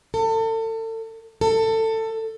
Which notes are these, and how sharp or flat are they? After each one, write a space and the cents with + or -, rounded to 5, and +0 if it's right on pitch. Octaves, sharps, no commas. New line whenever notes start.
A4 +35
A4 +20